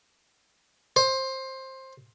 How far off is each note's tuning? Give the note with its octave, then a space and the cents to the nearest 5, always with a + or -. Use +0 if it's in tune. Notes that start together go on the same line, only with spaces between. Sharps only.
C5 +15